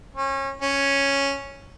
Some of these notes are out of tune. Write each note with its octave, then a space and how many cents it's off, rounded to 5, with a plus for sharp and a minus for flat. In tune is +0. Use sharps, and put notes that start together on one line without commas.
C#4 -30
C#4 +0